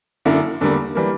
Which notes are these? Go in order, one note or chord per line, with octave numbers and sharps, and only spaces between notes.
F#2 D3 A#3 E4 A#4
E2 D3 G3 A#3
E3 G3 A#3